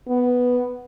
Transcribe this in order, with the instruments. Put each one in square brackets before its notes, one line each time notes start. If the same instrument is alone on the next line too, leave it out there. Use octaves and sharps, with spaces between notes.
[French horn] B3